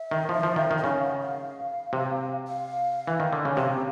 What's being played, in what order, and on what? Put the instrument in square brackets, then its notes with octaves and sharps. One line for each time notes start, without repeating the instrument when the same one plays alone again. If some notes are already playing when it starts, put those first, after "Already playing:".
Already playing: [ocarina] E5
[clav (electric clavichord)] D#3
F3
F3
D#3
D#3
[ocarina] E5
[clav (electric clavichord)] C#3 [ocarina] F5
[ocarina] F#5
F5
[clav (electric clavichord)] C3
[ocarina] F5
[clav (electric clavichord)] E3
D#3
D3
C#3
[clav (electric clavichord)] C3 [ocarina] F5